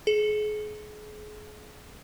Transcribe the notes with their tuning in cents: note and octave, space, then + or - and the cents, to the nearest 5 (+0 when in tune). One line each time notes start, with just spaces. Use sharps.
G#4 +35